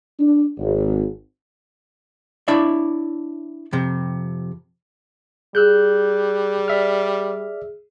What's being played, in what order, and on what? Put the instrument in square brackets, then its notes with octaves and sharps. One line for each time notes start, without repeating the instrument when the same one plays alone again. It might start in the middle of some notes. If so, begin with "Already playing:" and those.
[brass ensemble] D4
G#1
[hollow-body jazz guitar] D4 E4 C#5 D5 E5
F2 C3
[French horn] G3 [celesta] G#4 [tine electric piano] E6 F#6 G6
[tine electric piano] D5 E5 F6